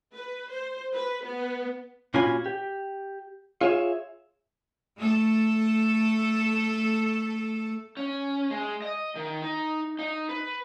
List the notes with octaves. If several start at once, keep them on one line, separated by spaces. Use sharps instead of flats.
B4
C5
B4
B3
A#2 C#4 F4 F#4 G#5 B5
G4
F4 G#4 C#5 E5
A3 A4
C#4
G#3
D#5
D#3
D#4
D#4
B4